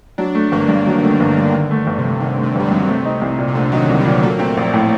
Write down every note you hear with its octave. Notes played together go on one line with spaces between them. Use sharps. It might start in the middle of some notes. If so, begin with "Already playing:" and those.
F#3 D4
A3
G1 A#3
G2
D#3 F#3
D3 A3
G1 D#3
G2 D3
D3 D#3
A3
G1
C3
G2
D3 D#3
A3
C3
G1 G3
F#3
G2 D#3
D3
C3 A3
D#4
C2
A#2
C3
D3 A3
F#3 D#4
D#3
C2
G3
A#2
F#3 A3
A#3
A3 C4
A#1
A2